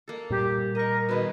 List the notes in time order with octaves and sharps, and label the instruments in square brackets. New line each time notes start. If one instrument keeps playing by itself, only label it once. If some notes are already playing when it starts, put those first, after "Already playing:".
[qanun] A#3 A4
[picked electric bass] A#2 G3 [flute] G4
[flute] A#4 [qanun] D#5 C#6
[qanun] B2 D#3 G#4 [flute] B4